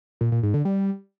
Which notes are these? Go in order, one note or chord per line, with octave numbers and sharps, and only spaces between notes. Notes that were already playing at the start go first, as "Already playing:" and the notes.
A#2
A#2
G#2
D3
G3